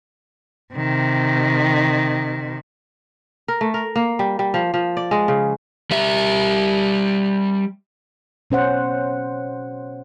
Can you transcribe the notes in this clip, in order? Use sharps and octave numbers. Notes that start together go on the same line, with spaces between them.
C3 D#3
A#4
A3
A#4
A#3
G3
G3
F3
F3
D5
G#3
C#3
G3 E5
B2 C#4 C5 F#5